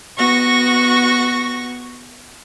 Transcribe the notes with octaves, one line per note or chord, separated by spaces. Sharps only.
B3 F#4 C#6 A#6